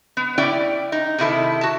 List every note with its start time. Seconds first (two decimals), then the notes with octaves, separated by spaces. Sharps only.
0.17 B3
0.38 C#4 E4 D5 G5
0.92 D#4
1.18 C3 D#3 E4 A4
1.61 F#4 A5